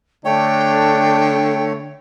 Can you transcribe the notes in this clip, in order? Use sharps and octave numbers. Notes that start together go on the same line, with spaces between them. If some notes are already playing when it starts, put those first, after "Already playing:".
D3 A3 D4 C#5 G5